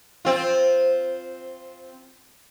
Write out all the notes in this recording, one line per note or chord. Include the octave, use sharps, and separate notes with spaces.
C4 F4